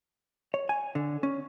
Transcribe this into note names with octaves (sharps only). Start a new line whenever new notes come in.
C#5
G#5
D3
C#4